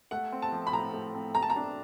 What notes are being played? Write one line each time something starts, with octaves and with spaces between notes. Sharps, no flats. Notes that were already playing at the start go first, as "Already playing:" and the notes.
A3 F#5
C4
A5
F3
B5
A2 A#5
A3
C4
A3 A#5
A5
A#5
D4